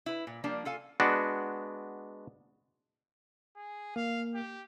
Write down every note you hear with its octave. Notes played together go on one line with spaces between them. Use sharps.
E4 B4
A#2
F3 G3 A#3 D4
F4 A4 F5 G#5
G#3 B3 D4 F#4
G#4
A#3 F5
G4